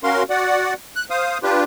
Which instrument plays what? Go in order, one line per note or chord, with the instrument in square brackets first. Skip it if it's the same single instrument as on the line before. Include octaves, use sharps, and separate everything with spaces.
[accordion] C#4 F#4 A#4 F5 C6
F#4 D5 F#5
F#6
C5 F5 D#6
D4 F4 G4 B4